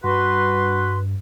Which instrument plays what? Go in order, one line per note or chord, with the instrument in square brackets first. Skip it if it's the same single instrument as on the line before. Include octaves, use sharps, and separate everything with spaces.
[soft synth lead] G2 [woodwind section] F#4 B4 [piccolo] C6